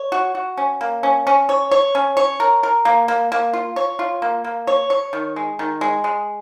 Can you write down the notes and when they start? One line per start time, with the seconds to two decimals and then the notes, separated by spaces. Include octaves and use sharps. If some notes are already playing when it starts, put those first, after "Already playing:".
Already playing: C#5
0.12 F#4
0.35 F#4
0.58 C#4
0.81 A#3
1.03 C#4
1.27 C#4
1.49 C#5
1.71 C#5
1.95 C#4
2.17 C#5
2.40 A#4
2.63 A#4
2.85 A#3
3.08 A#3
3.32 A#3
3.53 F4
3.76 C#5
3.99 F4
4.22 A#3
4.44 A#3
4.67 C#5
4.90 C#5
5.13 D#3
5.36 G#3
5.59 D#3
5.81 G#3
6.04 G#3